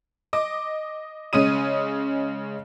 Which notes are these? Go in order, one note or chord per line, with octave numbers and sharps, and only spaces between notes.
D#5 D6
C#3 G#3 C#4 D#6 D#7